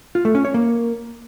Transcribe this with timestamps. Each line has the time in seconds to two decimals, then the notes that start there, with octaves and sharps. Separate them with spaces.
0.15 F4
0.25 A3
0.35 C#4
0.45 C#5
0.54 A#3